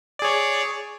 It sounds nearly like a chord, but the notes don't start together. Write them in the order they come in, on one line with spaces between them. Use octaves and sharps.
D5 G#4 C#5